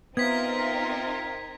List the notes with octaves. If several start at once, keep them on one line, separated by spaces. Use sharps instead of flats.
B3 C4 D#4 F4 A#4 E5 G#6 B6